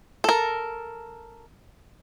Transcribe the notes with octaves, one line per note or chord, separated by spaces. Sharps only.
A4 A#4